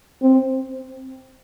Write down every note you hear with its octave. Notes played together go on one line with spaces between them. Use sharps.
C4